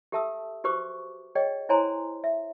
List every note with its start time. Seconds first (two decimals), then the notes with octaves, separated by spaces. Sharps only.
0.12 G4 A4 E5 A5 D#6 E6
0.64 F#4 G4 B4 C5 C#6 D6
1.35 G#4 C#5 D#5 G5
1.69 E4 C5 C#5 G#5 A#5 C6
2.24 E5